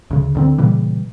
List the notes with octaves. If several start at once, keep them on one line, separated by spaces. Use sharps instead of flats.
D2 C#3
D2 D3 C4
A#2 C#3 E3 G3